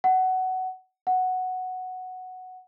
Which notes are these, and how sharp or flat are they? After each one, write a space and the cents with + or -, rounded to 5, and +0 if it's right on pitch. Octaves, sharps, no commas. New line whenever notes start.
F#5 +15
F#5 +0